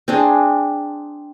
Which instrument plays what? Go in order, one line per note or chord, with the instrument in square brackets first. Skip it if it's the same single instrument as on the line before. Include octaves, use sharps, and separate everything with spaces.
[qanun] C4 D4 G#4